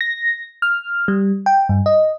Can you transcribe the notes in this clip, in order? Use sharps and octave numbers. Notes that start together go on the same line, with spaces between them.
A#6
F6
G3
G5
G2
D#5